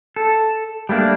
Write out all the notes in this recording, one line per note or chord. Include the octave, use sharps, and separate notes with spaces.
A4
G3 A3 A#3 D4